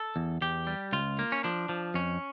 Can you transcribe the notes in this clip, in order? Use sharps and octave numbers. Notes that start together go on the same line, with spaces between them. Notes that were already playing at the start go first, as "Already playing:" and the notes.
Already playing: A4
E2
E2 G4
G3
C#2 F4
A#3
C#4
F3 D4
F3
F2 C#4